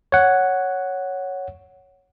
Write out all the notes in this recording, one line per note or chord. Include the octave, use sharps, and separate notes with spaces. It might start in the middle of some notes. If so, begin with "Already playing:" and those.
C#5 F#5